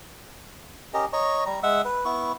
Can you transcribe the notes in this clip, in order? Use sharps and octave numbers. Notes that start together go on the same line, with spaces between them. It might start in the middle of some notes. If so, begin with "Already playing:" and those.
C#4 G4 A#4 D#5
C#5 D#5 A#5 C#6
G3 A#5
G#3 E5 F#5 E6
B4
B3 E4 C#6